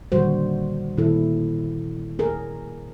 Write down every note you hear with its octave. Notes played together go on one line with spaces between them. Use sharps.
A#2 D3 D#3 G3 F#4 C5
A#2 D#3 E4 A4
G#4 A#4